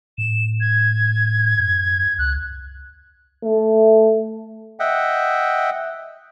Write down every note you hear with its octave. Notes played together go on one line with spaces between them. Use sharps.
A2 E7
G#6
F#2
C#2 F#6
A3
D#5 E5 F#5 G5